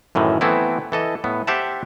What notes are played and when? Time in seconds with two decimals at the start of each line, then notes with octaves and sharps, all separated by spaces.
0.15 F#2 A2 D#3 E3
0.41 E3 A3 B3 C4 E4
0.92 E3 A4 D#5
1.24 A2 B3
1.47 G4 C5 E5 F#5 A5